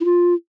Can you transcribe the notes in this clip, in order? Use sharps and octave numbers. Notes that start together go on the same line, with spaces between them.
E4
F4